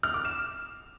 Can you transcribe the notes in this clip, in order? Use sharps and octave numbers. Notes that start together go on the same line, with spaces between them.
F6
D6
E7